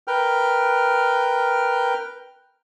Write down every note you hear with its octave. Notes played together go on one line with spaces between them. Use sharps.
A#4 B4 G5 F6